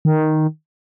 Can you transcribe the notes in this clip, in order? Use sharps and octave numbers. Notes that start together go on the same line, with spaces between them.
D#3